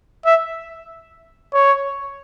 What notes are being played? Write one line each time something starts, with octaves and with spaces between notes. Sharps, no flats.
E5
C#5